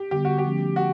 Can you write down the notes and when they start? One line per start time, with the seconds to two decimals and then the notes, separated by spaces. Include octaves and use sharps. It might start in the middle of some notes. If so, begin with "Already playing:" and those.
Already playing: G4
0.11 D3 G3 B3 G4
0.25 F#4
0.38 G4
0.44 F3 A3 C#4
0.76 C#4 F#4